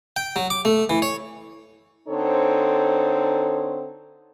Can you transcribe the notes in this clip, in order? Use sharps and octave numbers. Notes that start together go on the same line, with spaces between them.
G5
F#3
D6
A3
E3
C#5
D3 C4 D#4 A4 C5 C#5